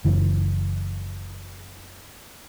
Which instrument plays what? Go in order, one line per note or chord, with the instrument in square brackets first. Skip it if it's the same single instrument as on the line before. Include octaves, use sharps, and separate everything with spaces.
[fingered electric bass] F#1 E3